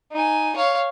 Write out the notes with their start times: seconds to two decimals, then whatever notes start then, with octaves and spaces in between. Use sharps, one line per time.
0.12 D#4 G#5
0.56 C#5 F5